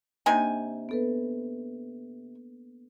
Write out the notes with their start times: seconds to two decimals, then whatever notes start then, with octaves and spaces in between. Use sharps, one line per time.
0.26 C3 A#3 D4 D#4 G#5
0.89 B3 A4 B4